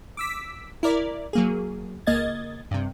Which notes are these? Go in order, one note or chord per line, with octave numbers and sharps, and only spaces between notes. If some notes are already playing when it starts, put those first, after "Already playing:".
D6 E6 B6
E4 A#4 D5
F#3 A#3 G#4
C#2 A#3 D#5 G#6 A6
G2 C3